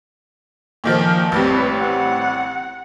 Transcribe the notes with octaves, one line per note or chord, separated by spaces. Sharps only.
A#2 D#3 F3
A1 G3 C4 B4
F#5